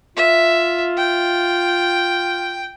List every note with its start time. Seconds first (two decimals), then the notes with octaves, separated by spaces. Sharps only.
0.17 F4 E5
0.98 G5